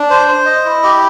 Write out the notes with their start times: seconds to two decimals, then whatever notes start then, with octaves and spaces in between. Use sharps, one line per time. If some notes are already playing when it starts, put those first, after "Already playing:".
Already playing: D4
0.10 C5
0.28 C5
0.46 D#5
0.65 E4
0.83 G4